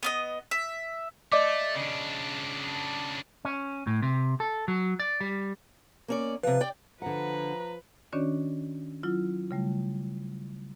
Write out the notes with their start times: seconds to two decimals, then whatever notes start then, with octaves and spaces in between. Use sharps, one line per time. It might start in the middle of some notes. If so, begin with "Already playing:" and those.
0.03 B3 D5 D#5
0.51 E5
1.32 A3 D5 D#5 D6
1.75 C#3 D4
3.45 C#4
3.87 A2
4.02 C3
4.40 A4
4.68 F#3
5.00 D5
5.21 G3
6.08 A#3 C#4 D5
6.43 C3 F3 B4
6.61 D5 G5
7.02 D3 F3 B4 F#5 A#5
8.12 D#3 C#4 D4 F#4 C#5 D5
9.03 F#3 E4 F4
9.51 C#3 G3 A3